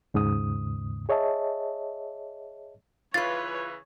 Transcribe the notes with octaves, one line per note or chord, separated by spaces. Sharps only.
D#2 G#2 C#3 D#6
G#4 C#5 D#5 E5 A5
C#3 E3 F4 B4 C#5 A6